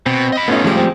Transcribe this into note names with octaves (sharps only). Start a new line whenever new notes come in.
B2 C4
D#5 B5
A2 A3 B3 C#4 D#4 F4
A2 C#3 F3 G3 G#3 G4
C4